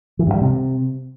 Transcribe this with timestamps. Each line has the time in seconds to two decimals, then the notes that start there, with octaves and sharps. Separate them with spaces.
0.19 E3
0.26 G2
0.34 G3
0.41 C3